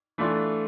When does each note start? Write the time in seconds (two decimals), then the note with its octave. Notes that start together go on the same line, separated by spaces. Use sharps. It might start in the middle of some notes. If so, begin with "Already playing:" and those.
0.18 E3 A3 D4 F4